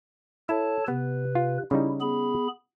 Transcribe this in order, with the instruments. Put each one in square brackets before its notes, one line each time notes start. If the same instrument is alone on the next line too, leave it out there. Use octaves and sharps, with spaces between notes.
[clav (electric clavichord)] E4 [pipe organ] A4 C#5 A5
[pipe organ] C3 B4 [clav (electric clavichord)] B3
[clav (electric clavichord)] F4
[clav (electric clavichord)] C#3 G3 D#4 [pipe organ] E4
[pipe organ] B3 G#4 B5